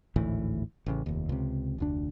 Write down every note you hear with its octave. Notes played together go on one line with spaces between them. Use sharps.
G#1 D2 A2 E3
A1 C#3
F1 D#2
C#2 C3
F1 D2 D4